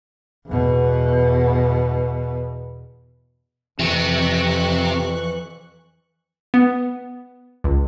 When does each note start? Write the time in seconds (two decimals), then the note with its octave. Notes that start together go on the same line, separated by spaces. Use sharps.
0.47 E2 B2
3.79 F2 C3 E3 C#6 F#6
6.54 B3
7.64 C#2